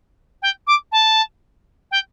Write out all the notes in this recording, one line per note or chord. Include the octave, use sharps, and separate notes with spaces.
G5
D6
A5
G5